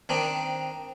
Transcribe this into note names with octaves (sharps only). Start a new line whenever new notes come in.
D#3 C4 D4 D#4